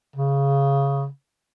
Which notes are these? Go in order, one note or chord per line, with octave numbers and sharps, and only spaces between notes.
C#3